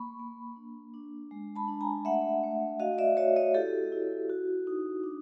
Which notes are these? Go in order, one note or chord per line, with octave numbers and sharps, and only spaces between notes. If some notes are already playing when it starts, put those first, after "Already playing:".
Already playing: A#3 B5 C#6
A#3
D4
D4
G#3
A5 B5
D4
G#5 A#5
A3 E5 F#5
A3
F#4 D#5 F5
D5 E5
F#4 C#5 D#5
C#5 D#5
E4 G4 A4
E4
F#4
D#4
D4